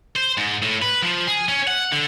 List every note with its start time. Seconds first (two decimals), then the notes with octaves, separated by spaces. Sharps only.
0.16 C5
0.37 G#2
0.63 A2
0.82 B4
1.03 F3
1.27 G#4
1.49 C#4
1.67 F#5
1.92 D3